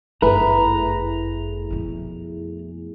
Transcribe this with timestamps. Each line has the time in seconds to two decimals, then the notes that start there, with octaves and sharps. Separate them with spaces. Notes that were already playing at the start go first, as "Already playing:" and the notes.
0.22 G1 F#2 A3 E4 G#4 B4 A#5
1.70 F2 B2